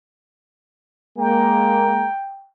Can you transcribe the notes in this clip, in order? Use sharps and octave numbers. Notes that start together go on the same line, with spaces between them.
G#3 A#3 G5 A#5